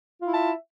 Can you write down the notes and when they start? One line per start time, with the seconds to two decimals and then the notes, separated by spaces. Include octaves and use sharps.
0.20 F4
0.25 E4
0.29 E5
0.34 A5